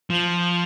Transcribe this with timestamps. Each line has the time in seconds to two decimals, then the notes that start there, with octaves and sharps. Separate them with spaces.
0.10 F3